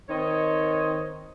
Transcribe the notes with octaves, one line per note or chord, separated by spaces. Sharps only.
D#3 C4 C#5 D#5